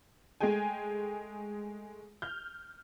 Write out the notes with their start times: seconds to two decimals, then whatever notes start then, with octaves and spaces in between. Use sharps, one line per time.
0.41 G#3 A3 G#4 G5 G#5
2.22 F6 G6